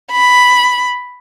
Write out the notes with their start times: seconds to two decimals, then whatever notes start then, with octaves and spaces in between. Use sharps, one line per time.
0.12 B5